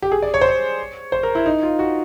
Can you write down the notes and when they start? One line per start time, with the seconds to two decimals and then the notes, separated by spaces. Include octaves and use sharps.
0.02 G4
0.12 G#4
0.22 D5
0.34 C#5
0.41 C5
0.49 C#5
1.12 C5
1.23 A#4
1.35 E4
1.46 D#4
1.63 F4
1.79 F#4